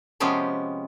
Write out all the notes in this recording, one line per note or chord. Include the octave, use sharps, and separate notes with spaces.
C3 F3 G#3 B3 C#4 G4